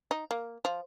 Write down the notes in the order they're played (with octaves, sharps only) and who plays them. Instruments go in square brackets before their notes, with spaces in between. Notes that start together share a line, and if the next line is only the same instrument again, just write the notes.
[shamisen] D#4
A#3
F3